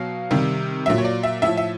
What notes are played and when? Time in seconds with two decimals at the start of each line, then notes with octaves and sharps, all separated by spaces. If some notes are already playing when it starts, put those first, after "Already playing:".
Already playing: B2 F#3 F5
0.31 C3 D#3 G3
0.86 A#2 F#3 E5
0.98 C#5
1.05 D5
1.23 E5
1.42 A2 F3 E5
1.57 E5